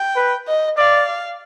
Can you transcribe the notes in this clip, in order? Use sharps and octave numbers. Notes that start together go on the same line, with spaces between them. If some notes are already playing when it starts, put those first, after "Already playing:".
Already playing: G5
B4
D#5
D5 F5